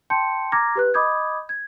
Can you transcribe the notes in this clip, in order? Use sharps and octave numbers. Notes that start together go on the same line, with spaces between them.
G5 A5 C6 G6 C#7
A#5 D6 F6 G#6 A#6
G4 B4 F#6
D#5 B5 D6 D#6 G6 G#6
G#6